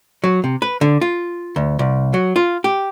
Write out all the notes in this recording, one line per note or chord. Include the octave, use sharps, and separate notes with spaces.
F#3
C3
B4
D3
F4
D2
C2
F#3
F4
G4